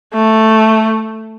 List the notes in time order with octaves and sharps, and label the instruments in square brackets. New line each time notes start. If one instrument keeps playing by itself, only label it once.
[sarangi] A3